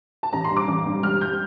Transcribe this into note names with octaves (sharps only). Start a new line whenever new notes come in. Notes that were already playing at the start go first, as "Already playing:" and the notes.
A5
A1 A#5
C6
G2
D6
A1
G2
G3 F6
G6